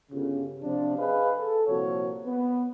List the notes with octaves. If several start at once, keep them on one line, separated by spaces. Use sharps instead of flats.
G1 C#3
C3 F3 D4
G#4 B4 D#5 F5
A4
C2 A#2 F3 A#3 F#4 C#5
B3 B4